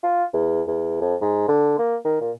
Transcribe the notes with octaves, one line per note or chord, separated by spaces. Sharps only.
F4
E2
E2
F2
G#2
D3
A#3
D#3
A#2